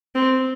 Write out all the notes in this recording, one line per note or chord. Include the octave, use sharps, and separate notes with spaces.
C4